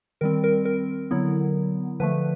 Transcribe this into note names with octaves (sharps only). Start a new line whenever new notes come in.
D#3 G3 C4 A#4
A#4
A#4
D3 F#3 B3 E4
D3 F3 A3 B4